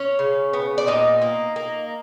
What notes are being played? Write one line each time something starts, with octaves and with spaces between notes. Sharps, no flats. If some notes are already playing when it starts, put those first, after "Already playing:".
Already playing: C#4 C#5
C#3
B3
D5
A#2 D#4 D#5
A#3
A#3